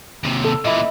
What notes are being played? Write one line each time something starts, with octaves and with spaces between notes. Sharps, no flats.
D#2 C3
A4
A#2 E3 D#5 E5 B5